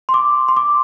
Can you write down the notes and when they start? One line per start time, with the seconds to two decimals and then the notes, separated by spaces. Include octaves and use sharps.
0.09 C6
0.14 D6
0.48 C6
0.57 D6